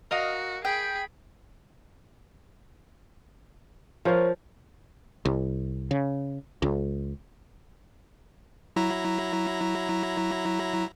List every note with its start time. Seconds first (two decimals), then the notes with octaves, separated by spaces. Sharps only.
0.11 F#4 A#4 D#5 F5
0.65 G#4 G5 B5
4.05 F3 A#4 C5 C#5 F5
5.25 C2
5.91 C#3
6.62 C#2
8.76 F#3 E4 A#5